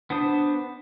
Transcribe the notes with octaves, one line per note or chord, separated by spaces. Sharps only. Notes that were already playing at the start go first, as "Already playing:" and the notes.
B3 D4 C5 D#6